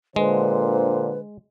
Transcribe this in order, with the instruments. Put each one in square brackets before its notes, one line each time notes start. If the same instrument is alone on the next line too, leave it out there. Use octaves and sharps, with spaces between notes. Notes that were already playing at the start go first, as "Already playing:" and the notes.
[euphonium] A#2 [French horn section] D3 C5 [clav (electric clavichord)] G#3 [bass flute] B4